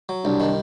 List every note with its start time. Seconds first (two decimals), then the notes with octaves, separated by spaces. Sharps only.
0.09 F#3
0.25 C2 D4
0.40 D#3